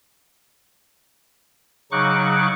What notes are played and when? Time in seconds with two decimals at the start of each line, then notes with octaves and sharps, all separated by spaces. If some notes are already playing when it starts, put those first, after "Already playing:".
1.92 C#3 F#3 D#4 C#6 D6 F#6